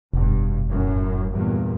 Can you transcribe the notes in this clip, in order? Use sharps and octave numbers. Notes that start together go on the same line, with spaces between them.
F1 G2 B2
F#2 A2
E2 G2 A#2